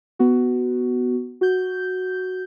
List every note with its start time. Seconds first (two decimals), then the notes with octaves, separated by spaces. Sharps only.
0.19 B3 F#4
1.41 F#4 G6